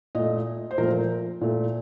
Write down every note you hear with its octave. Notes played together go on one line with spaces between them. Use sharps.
A#2 A3 D#5
C5
A#2 F3 A3 A#4
A#2 A3